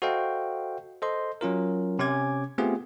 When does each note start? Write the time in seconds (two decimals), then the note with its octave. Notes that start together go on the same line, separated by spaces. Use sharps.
0.02 F#4 A4 C5 D#5 F5 G5
1.02 A4 C5 D#5 C6
1.41 F#3 C#4 F4 A#4
1.99 C3 C#4 G#5 D6 G#6
2.58 A3 B3 C4 F4 G4 G#4